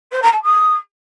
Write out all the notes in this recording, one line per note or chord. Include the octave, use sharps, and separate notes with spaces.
C5
A#5
A5
D#6